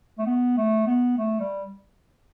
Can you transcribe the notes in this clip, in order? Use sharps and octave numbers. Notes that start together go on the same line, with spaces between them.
A3
B3
A3
B3
A3
G3